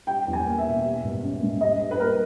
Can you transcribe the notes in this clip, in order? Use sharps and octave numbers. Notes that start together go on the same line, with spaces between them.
G3 G5
E2
G#5
A#3
E5
B2
G3
G#1
C#4
G#2
G3 D#5
G2
B4
A#3 A#4